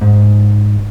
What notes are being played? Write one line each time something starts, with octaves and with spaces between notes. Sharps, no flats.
G#2